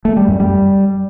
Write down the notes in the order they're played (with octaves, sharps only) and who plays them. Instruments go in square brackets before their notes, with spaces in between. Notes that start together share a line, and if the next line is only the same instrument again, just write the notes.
[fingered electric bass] A3
G3
F#2
G3